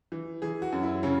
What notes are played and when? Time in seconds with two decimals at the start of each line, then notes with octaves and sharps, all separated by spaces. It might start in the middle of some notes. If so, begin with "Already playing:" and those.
0.12 E3
0.42 E3 G#4
0.62 F#4
0.72 F#2
0.83 E4
1.03 C#3 C#4